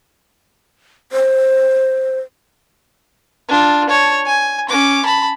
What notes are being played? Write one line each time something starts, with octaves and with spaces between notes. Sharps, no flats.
C5
D4 F4
C#5 A5
G#5
C#4 D6
A5 B5